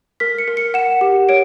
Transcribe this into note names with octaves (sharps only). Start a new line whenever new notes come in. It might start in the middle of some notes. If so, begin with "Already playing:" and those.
A#4 B6
C#7
A#4
C#7
F#5 E7
G4
C#5 D7